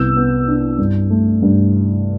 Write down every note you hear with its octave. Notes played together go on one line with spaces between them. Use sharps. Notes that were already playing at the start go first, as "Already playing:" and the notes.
Already playing: C2 B3 E6 G6
B3
D4
G2
A3
G2